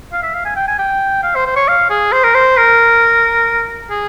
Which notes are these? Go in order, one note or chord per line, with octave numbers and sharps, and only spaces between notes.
F5
E5
F5
G#5
G5
G#5
G5
F5
C5
C5
C#5
F5
G#4
C5
A#4
C5
A#4
G#4